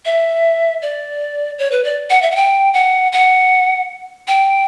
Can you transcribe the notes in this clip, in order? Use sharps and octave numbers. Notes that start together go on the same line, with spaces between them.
E5
D5
C#5
B4
D5
F#5
E5
F#5
G5
F#5
F#5
G5